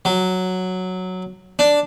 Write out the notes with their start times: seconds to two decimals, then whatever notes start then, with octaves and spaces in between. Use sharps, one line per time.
0.05 F#3
1.59 D4